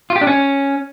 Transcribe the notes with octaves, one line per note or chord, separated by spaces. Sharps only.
F4
G4
D4
C#4